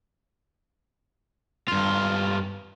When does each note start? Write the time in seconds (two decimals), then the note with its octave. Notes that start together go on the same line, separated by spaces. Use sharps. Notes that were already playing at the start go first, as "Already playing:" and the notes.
1.68 G2 F4